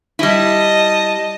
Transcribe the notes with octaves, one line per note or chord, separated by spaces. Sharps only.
G3 E4 D#5 A5